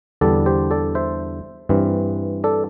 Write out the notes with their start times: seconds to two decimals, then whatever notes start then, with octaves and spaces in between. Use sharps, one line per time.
0.21 E2 D3 G3 D4 A4 D5
0.46 G4 C5
0.71 A4 D5
0.95 C5 E5
1.69 G2 E3 C4
2.44 A4 D5